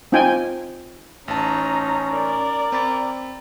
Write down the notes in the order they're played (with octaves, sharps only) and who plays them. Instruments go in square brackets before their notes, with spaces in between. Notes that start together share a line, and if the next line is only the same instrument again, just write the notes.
[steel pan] C4 D#4 F4 G5 G#5
[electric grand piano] A1 A5 [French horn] C#4 [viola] D#4 A#5
[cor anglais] A#4 [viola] D5
[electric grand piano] C4 B5 A6